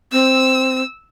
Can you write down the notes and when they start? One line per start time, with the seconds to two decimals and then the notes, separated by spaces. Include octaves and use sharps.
0.12 C4 E6